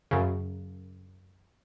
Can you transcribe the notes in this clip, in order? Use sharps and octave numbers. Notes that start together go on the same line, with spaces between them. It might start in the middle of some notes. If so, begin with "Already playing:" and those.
F#2 C#3